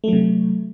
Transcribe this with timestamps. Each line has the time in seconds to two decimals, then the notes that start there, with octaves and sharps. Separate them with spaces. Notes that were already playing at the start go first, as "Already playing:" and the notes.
0.04 A3
0.08 F#3
0.13 C3